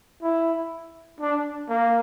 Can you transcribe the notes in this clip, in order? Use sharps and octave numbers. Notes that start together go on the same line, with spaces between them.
E4
D4
A#3